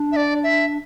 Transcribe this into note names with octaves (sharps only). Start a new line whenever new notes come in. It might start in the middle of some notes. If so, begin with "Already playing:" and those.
Already playing: D4
E5
D5
E5